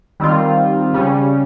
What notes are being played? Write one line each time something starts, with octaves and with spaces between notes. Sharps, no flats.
D#3 G3 C4 F4
C#3 G3 C#4